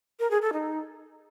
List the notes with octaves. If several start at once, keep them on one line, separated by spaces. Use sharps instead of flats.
A#4
G#4
A4
D#4